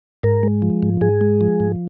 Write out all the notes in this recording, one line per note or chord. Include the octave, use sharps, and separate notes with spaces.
G#2 A#4
G#3
F3
G#2
G#2 G#4
G#3
F3
G#2